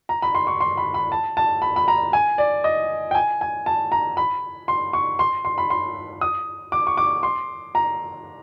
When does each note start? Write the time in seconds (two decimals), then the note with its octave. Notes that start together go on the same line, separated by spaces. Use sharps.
0.09 A#5
0.22 B5
0.35 C6
0.47 C#6
0.61 C6
0.77 B5
0.94 B5
1.12 A5
1.37 A5
1.62 B5
1.76 B5
1.88 A#5
2.13 G#5
2.38 D5
2.64 D#5
3.11 G5
3.15 G#5
3.41 G#5
3.66 A5
3.92 A#5
4.17 B5
4.68 C6
4.93 C#6
5.19 C6
5.45 C6
5.58 B5
5.70 C6
6.21 D#6
6.72 D6
6.87 C#6
6.97 D6
7.23 C6
7.75 A#5